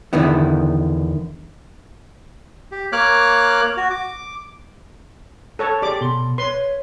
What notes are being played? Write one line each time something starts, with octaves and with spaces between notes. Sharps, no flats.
E2 D3 D#3 B3 E4
G4
A#3 C#5 D6 F6 F#6
F#4
D6
A4 C#5 A5
G4 G#4 D5 D6
B2 C6
B4 C#5 C6